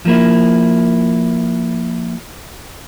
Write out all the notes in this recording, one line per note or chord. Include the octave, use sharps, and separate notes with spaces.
F3 A#3 E4